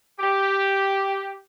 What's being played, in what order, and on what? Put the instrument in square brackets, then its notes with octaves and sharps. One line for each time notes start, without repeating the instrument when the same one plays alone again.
[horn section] G4